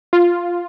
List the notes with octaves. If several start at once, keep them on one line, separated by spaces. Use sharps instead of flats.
F4